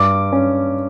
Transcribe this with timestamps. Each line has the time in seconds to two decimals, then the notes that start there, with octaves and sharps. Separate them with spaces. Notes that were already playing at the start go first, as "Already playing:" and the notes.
Already playing: G2 D6
0.32 C#4